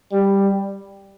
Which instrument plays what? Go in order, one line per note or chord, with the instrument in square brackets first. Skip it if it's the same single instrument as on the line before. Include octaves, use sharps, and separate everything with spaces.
[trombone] G3